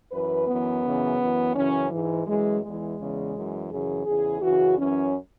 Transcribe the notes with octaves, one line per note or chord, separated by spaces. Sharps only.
F#2 E3 B4
F#2 E3 B3
F#2 C#3 E3
F#2 E3
F#2 C#3 E3 C#4
G#2 E3
F#2 E3 G#3
E2 E3 G#3
E2 C#3 E3
F#2 E3
F#2 C#3 E3 G#4
E2 C#3 E3 G#4
F#2 C#3 E3 F#4
F#2 E3 C#4